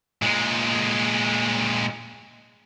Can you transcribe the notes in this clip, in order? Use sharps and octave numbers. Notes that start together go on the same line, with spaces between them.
A#2 G#3